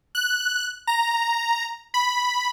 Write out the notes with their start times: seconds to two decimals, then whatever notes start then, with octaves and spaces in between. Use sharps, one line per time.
0.15 F#6
0.87 A#5
1.94 B5